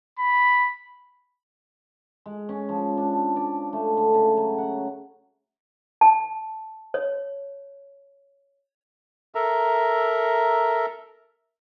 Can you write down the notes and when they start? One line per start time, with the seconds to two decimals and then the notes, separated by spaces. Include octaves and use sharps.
0.19 B5
2.26 G#3
2.49 C#4
2.69 F3
2.97 D4
3.36 D5
3.73 A3
3.97 D3
4.14 C#3
4.37 F#3
4.58 F#5
6.01 A5
6.94 C#5
9.35 A4 A#4 E5 A#5